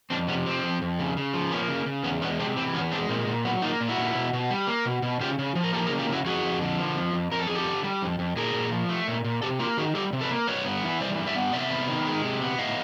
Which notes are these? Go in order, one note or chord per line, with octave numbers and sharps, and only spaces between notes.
F2 C4 D4
C3 B3 C#4
F3 C4
F2
F2
C#3
C#3
F3
A#3 B3 C#4
C#3
C#3
E2 B3 C#4
G#3 B3 C#4
C3 C4 D4
E3 C4
E2 B3 C#4
G#3 C4 D4
A#2 C4
A#2
F#3 B3
A#3 D#4 F4
A#2
E4 F#4
A#2
B2
B2
G3
A#3
B2
B2
C#3 F4 G4
C#3
F3
A#4
A#3 G4 A4
G#4 A#4
C#3
F4 G4
C#3 E4 F#4
F2 F#4 G#4
F2
D3
F3
F2
F2
F2 A#4
A4
F2 G#4
G4 A4
D3
G3
F2
F2
A#2 G#4 A#4
A#2
F3
A3
A#2
A#2
C3 G4 A4
A#3 F4 G4
D#3 F#4 G#4
G3 G4 A4
C3
A4 B4
A#3
G2 B4 C#5
B3
E3
G3 C5 D5
G2
D5 E5
B3
C3 D5 E5
B3
D#3
G#3
C3
B3
A2 D#5 F5